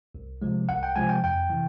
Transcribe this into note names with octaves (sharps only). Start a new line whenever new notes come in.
C2
C3 F3 G#3
C2 F#5
G5
C3 F3 G#3 G#5
G5
F2 G5
C3 E3